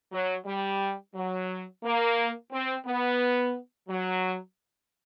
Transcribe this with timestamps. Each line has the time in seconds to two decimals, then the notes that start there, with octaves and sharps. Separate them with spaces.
0.12 F#3
0.46 G3
1.14 F#3
1.83 A#3
2.51 C4
2.85 B3
3.88 F#3